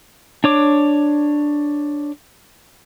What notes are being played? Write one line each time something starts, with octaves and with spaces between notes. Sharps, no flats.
D4 C#5 D6